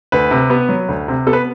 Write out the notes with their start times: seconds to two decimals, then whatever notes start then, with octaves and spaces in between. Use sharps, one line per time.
0.12 D2 B4
0.31 C3
0.50 B3
0.69 F#3
0.89 D2
1.08 C3
1.27 B3 A4
1.33 B4